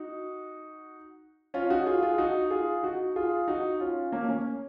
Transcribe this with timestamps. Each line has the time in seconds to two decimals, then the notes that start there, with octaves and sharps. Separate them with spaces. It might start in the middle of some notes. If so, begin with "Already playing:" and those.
Already playing: D#4 F#4
1.54 C#4 F4
1.70 D#4 F#4
1.86 F4 G#4
2.03 F4 G#4
2.18 D#4 F#4
2.50 F4 G#4
2.83 D#4 F#4
3.16 F4 G#4
3.48 D#4 F#4
3.80 C#4 F4
4.12 A#3 C#4
4.29 A#3 C#4